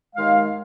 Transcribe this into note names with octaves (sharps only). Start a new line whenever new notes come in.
D#2 D#3 G#3 F5